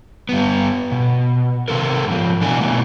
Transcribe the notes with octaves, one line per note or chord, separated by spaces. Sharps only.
G2 B3
B2
C3 E3 A4 A#4
G#2 F3
B2 E3 D4 F#4 G#5
B2 D#3 E3 A3